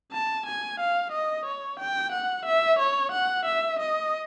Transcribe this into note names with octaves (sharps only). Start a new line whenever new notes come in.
A5
G#5
F5
D#5
C#5
G5
F#5
E5
C#5
F#5
E5
D#5